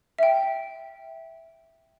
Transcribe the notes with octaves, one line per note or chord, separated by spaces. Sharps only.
E5 G5